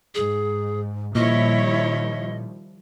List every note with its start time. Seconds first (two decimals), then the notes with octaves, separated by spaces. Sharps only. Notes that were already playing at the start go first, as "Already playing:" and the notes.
0.15 G#2 G#4
1.15 A#2 D#3 F3 G3 E4 C#5 D#5